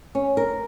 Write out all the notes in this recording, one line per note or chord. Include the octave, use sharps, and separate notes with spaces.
C#4
A#4